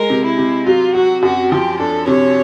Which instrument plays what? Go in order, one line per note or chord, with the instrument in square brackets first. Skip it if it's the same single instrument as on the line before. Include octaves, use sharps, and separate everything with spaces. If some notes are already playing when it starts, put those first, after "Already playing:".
Already playing: [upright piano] G#3 [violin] A#4
[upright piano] C3
[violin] E4
[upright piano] C3
[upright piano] F#3 [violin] F4
[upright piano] F#3 [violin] F#4
[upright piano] F#2 [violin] F#4
[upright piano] F3 [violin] G4
[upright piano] D4 [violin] A4
[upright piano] C3 [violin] C#5